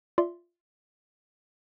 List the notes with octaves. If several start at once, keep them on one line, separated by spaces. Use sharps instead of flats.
F4 D5 E5 C6